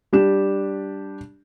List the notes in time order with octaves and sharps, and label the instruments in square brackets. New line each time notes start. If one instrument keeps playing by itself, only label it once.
[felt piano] G3 D4 G4 E7